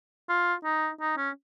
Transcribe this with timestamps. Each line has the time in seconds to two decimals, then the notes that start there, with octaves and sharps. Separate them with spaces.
0.29 F4
0.64 D#4
1.00 D#4
1.17 C#4